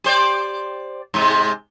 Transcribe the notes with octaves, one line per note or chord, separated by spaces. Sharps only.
G4 C5 D5
G#2 C3 G#3